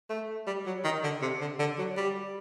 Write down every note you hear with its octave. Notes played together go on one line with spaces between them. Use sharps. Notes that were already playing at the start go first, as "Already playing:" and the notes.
A3
G3
F#3
D#3
D3
C3
D3
D3
F#3
G3